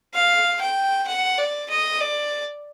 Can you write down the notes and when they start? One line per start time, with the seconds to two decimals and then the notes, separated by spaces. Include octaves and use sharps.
0.14 F5
0.61 G5
1.07 F#5
1.38 D5
1.69 D#5
2.01 D5